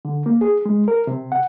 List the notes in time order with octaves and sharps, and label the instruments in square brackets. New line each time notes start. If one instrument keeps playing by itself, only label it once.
[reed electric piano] D3
A#3
G#4
G#3
A#4
C3
F#5